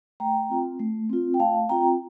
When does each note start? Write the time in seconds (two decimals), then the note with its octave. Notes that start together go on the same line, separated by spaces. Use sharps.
0.20 A3 G5 A#5
0.50 C4 F4
0.79 A3
1.09 C4 F4
1.34 G5
1.39 A3 F5 A5
1.69 C4 F4 G5 A#5